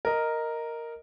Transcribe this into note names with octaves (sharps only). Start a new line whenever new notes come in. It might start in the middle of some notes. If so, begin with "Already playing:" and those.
A#4 D#5